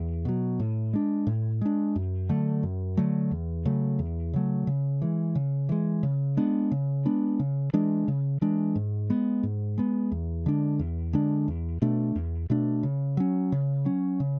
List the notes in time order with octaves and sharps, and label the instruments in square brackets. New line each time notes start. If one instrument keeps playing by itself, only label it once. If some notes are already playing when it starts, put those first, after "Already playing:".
Already playing: [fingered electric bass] E2
B2 F#3
A2
G#3 D4
A2
G#3 D4
F#2
D3 F#3 A3
F#2
D3 F#3 A3
E2
C#3 F#3 A3
E2
C#3 F#3 A3
C#3
E3 G#3
C#3
E3 G#3
C#3
G#3 B3 D4
C#3
G#3 B3 D4
C#3
E3 G#3 D4
C#3
E3 G#3 D4
G#2
G#3 B3
G#2
G#3 B3
E2
D3 G#3 D4
E2
D3 G#3 D4
E2
B2 A3 D4
E2
B2 A3 D4
C#3
F#3 C#4
C#3
F#3 C#4
C#3